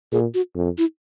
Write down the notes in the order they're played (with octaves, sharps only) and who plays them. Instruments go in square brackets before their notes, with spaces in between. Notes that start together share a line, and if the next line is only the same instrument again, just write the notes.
[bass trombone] A#2 [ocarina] G#4
[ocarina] F#4
[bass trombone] F2
[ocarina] E4